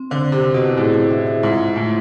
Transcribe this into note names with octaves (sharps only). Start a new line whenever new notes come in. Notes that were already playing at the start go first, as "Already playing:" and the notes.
Already playing: C4
D3 C5
C5
C3
C5
B2
E4
A2 G#4
E4
E5
E4
G#2 F4
F4
A2 A3